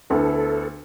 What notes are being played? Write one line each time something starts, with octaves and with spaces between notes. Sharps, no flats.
D2 D3 B3 E4 A4